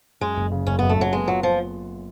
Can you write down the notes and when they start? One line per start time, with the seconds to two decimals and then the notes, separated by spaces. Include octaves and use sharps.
0.21 F#2 G#3
0.37 F#1
0.51 C#3
0.67 F#1 C#4
0.79 F#2 B3
0.89 A3
0.97 F#1 F#3
1.12 G#3 B3
1.28 F#3 F4
1.43 F3 F4